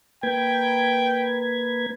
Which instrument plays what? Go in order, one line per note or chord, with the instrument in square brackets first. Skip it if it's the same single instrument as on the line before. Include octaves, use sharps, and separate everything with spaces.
[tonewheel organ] A#3 B4 G#6 [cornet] G5